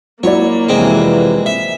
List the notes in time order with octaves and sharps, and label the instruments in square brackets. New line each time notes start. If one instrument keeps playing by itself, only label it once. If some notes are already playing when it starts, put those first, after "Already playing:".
[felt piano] F#3 E4 D5 [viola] A#3 [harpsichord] C#5
[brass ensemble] F2 C3 E3 [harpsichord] G#3 C4
[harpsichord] E5